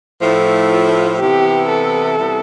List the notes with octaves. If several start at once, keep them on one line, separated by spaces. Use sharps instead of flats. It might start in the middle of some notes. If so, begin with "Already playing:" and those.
A2 F3 A3 E4
F4
C3 E3 B3 E4 G4
A4
C3 G3 B3 E4